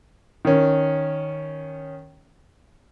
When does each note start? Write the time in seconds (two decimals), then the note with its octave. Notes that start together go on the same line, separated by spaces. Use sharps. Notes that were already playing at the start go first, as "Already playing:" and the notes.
0.45 D#3 C#4